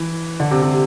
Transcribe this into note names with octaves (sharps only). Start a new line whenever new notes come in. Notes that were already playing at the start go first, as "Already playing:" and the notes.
Already playing: E3
D3
C3
C3